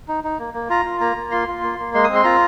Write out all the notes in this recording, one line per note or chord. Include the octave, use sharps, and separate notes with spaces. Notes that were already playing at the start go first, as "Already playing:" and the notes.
D#4
D#4
A#3
A#3
F4 A#5
F4
A#3 A#5
A#3
F4 C6
F4
A#3
A#3
G#3 C6
C4 D#6
C6
F4 A#5